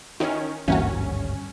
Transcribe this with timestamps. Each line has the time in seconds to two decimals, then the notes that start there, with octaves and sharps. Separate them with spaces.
0.20 D#3 C#4 D#4 E4
0.68 G#1 D2 G2 E3 A#3 C#4 F#4